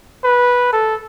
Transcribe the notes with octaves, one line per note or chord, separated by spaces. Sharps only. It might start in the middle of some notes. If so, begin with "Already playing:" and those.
B4
A4